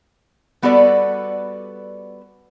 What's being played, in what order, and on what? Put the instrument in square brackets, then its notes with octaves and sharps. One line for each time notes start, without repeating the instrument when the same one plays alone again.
[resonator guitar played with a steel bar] G3 B3 F#4 A4 B4 D5